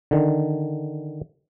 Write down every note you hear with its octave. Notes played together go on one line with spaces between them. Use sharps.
D3 D#3